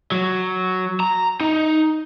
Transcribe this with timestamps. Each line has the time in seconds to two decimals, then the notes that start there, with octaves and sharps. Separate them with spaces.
0.12 F#3
1.00 A#5
1.41 D#4